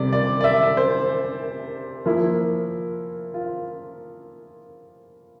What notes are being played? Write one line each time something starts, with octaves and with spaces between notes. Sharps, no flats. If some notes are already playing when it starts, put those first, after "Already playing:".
Already playing: C3 G3 D5
D5
D5
E5
C5
F3 A#3 E4
F4